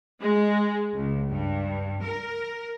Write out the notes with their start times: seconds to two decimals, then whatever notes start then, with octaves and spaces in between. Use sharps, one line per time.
0.21 G#3
0.95 C#2
1.31 G2
2.03 A#4